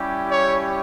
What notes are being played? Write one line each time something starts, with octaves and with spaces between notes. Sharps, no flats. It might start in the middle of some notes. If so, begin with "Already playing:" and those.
Already playing: G3 C#4 E4 G4
C#5